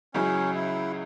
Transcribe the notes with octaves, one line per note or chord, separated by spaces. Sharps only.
C#2 C#3 F#3 C#4 E4
E4